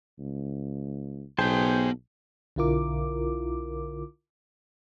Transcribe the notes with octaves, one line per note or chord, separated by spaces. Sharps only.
C#2
B1 B3 G#4 C5 G5 A5
B1 D3 E4 F4 A#4 D6